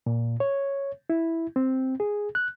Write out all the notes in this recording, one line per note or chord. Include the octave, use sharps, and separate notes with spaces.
A#2
C#5
E4
C4
G#4
F#6